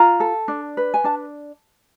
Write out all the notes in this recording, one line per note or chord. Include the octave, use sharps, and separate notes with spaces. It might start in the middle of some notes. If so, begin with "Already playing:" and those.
Already playing: F4 A#5
A4
D4
B4
G#5
D4 A5